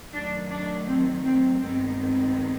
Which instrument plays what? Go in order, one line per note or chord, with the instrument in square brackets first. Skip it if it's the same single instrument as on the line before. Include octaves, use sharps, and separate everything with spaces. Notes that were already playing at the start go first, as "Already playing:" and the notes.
[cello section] F#2 D#3 F#3 A3 D4
D4
C4
C4
G2 D#3 G#3 B3 C4
C4